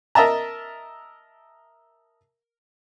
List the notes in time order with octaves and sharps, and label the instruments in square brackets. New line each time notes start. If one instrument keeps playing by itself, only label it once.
[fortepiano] A#4 D#5 E5 A5 A#5